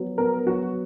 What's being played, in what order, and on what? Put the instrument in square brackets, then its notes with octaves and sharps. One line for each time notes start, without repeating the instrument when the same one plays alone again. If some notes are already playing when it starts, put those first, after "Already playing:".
Already playing: [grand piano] F#3 B3
[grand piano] B3 [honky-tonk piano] A#4
[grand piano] F#3 [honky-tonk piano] F#4